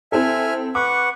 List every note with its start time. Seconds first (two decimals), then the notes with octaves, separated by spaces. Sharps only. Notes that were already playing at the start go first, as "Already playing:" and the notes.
0.12 C4 E4 A4 E5 G#5 F6
0.75 B4 F#5 C#6 D6